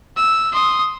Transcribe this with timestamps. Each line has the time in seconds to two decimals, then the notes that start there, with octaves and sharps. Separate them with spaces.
0.17 E6
0.53 C6 D#6